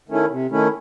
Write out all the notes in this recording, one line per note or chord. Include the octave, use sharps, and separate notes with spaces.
D#3 A3 C#4 E4
C3
D#3 A3 C#4 E4